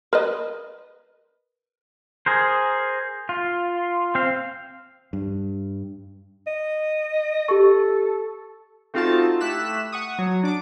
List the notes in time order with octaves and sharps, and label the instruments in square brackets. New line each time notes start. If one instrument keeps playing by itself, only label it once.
[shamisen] A#4 B4 D#5
[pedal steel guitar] G#4 A#4 C5
F4
C4 F5
[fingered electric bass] G2
[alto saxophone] D#5
[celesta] G4 C#6 [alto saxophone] A4
[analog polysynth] A3 C4 D#4 F4 F#4 A5
A3 E4 G4 F#6 B6 E7
F#5 C#6 D#6
F#3
D4 D6